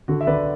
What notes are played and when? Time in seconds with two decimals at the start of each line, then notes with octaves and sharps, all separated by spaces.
0.08 D3 F#4
0.21 E5
0.27 D3 B4 D5